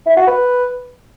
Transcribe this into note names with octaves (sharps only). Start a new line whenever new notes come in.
E4
F#4
B4